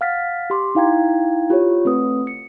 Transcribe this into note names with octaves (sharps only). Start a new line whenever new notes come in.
F5 F#5 F6 A6 B6
G4 C6 D6
D#4 E4 F5 G5 A#5 G#6
F4 G4 C5 C#5
A3 C4 B4 D#6
C#7